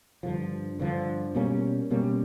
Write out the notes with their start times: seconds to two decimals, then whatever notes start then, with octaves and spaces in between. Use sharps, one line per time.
0.23 G2 D3 F3
0.79 G2 D3 F3
1.35 B2 G3 A#3 C#4
1.91 B2 G3 A#3 C#4